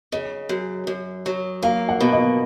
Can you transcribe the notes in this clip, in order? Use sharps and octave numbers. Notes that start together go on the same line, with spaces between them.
C#3 D#5
F#2
F#2
F#3
A#3 F5
F#5
B2
D#5